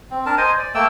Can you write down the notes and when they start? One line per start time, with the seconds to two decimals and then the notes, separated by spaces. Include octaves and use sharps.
0.10 C4
0.26 D4 A#4 A5
0.38 C5 D#5 G#5
0.58 D5
0.75 A3 A#3 G5 E6